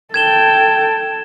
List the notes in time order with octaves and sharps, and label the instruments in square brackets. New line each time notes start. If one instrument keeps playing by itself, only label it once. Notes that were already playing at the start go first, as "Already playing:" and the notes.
[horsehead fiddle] A4 G5 [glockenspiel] G#6 E7 G7